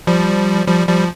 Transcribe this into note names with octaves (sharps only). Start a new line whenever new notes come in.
F3 G3
F3 G3
F3 G3